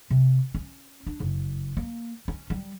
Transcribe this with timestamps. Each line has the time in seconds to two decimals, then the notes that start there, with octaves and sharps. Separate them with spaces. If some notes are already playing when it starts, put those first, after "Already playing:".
0.10 C3
0.55 C#4
1.07 D4
1.20 F#1
1.77 A#3
2.28 C#4
2.50 G3